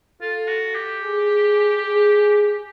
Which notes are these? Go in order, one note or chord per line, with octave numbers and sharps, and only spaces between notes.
F4 A4
F#4
G4
G#4
G#4